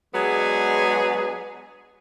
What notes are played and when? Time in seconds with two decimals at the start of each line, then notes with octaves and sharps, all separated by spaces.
0.14 F#3 G#3 B3 D4 G#4